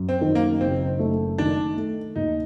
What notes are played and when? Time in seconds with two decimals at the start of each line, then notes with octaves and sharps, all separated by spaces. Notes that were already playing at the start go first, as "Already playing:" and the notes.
Already playing: F#2
0.09 C4
0.21 D#3
0.35 A#3
0.61 F#1 C4
0.99 A3
1.38 D#3 D4
1.77 A3
2.16 D#2 D#4